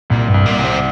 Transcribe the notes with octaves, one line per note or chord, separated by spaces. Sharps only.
C2 A#2
G2
C2
A#2
C2
C3